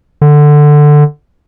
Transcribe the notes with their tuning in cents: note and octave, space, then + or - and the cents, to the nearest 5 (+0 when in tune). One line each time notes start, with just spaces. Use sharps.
D3 +10